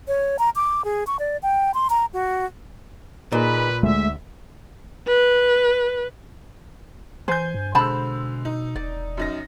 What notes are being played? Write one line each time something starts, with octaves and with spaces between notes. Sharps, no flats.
C#5
A#5
D6
G#4
C#6
D5
G5
C6
A#5
F#4
A#2 D#4 G#4 B4
D2 G#3 A3 E5
B4
E3 C5 G#5 G6
G2
B2 D3 G#3 C5 A5 B5 E6
D#4
E1 D5
F#2 D#4 A#6